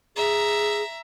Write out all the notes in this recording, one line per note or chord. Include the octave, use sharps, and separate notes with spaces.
G#4 E5 A#5